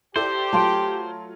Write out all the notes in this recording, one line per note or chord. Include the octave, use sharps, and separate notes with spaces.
E4 G4 A4 C5 D5
F#3 A3 F4 A5 C6 D7